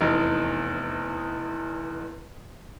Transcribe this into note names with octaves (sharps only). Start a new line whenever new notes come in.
F1 E2 D#4